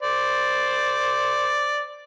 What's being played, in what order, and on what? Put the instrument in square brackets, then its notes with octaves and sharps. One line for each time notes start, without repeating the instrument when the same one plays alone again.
[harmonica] C5 D5